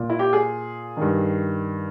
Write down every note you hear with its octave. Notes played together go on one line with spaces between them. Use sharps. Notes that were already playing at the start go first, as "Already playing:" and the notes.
Already playing: A#2
E4
G4
G#4
G2 D#3